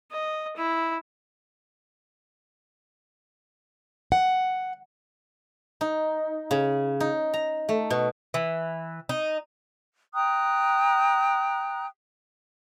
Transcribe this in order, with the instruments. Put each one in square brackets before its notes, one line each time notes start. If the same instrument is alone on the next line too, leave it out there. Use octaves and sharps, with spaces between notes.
[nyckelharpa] D#5
E4
[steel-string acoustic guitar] F#5
[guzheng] D#4
C#3
D#4
A#5
A3
B2
[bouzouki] E3
D#4
[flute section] G5 A#5 D#6 F#6